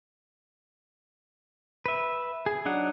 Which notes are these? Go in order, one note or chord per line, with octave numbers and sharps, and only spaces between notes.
B4 E5
G#4
F#3 D4 D#4 F#5